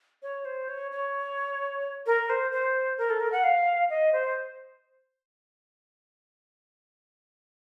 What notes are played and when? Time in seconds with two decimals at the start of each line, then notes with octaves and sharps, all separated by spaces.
0.23 C#5
0.45 C5
0.68 C#5
0.91 C#5
2.06 A#4
2.29 C5
2.52 C5
2.98 A#4
3.10 A4
3.20 A#4
3.32 F#5
3.43 F5
3.90 D#5
4.13 C5